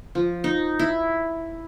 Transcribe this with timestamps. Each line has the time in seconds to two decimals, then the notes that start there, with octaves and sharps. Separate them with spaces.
0.15 F3
0.44 D#4
0.79 E4